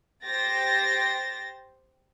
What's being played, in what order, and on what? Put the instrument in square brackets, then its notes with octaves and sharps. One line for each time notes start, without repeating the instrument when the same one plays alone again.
[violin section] G4 C5 A6 A#6